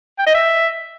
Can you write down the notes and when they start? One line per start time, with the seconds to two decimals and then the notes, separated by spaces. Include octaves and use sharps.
0.18 G5
0.26 D#5
0.34 E5